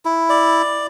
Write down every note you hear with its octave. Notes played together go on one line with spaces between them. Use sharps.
E4
D5